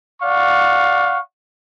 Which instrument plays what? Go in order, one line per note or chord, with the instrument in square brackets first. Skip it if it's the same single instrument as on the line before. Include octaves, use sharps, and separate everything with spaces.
[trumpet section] D5 F5 F#5 C#6